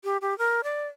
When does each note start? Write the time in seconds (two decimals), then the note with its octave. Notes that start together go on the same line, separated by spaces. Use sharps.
0.04 G4
0.21 G4
0.38 A#4
0.63 D5